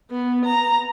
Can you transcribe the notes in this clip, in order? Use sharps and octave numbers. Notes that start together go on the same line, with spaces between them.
B3
A#5